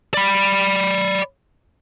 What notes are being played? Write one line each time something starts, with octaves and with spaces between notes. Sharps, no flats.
D5 B5